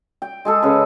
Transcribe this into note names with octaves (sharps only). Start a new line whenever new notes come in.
G5
G#3 G#4 A4
C#3 B4